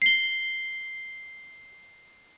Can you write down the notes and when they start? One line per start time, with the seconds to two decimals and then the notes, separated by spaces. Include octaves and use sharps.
0.02 C7 G7